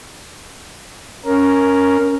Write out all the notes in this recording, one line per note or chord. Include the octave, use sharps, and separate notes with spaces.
C#4 A#4